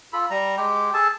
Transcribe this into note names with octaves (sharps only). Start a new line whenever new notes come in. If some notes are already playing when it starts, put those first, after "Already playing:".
F4 A4 B5
G3 A#5
G#3 G4
G#4 A4 A5